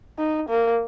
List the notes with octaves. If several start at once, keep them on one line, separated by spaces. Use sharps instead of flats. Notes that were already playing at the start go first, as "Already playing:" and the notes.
D#4
A#3